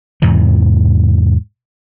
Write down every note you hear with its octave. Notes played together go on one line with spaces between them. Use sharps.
E2 G#2 C3 E3